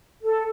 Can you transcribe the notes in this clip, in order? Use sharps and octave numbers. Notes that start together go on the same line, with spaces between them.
A4